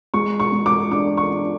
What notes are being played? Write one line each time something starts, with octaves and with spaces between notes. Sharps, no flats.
G#3 C#6
C#6
G#3
D6
D4 D6
C#6
D4